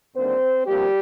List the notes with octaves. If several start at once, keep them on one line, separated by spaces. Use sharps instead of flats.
D#2 D3 G3 A#3 C4 D4 C5
D2 C3 F3 G3 A#3 G4